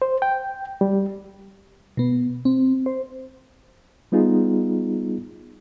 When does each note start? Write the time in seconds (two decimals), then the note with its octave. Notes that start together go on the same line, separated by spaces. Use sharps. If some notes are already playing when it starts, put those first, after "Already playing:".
0.02 C5
0.22 G5
0.81 G3
1.97 B2 B3
2.45 C4
2.86 C5
4.12 G3 B3 D#4 F4 G#4